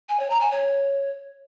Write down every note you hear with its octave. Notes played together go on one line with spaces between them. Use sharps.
G#5
C#5
A#5
G#5
C#5